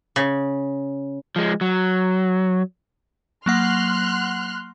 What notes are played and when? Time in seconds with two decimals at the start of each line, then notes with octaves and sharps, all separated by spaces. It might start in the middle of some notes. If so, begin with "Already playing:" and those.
0.16 C#3
1.36 F3 G#3
1.61 F#3
3.46 F#3 A#3 F#5 C6 F6 F#6